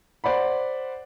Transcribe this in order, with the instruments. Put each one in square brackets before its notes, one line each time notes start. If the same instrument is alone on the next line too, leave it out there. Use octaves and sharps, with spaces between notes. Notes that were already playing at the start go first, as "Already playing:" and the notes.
[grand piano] C5 D5 F#5 B5